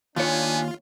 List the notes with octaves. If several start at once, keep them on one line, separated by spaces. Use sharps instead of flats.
D#2 B3 D4 F4 C#5 G#5